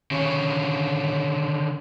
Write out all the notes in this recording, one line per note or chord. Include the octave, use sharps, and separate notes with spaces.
D3 D#3 C#4 C#5